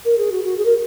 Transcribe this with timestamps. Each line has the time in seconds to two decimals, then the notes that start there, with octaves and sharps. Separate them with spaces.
0.05 A#4
0.18 G#4
0.32 F#4
0.44 F#4
0.58 G#4
0.65 A#4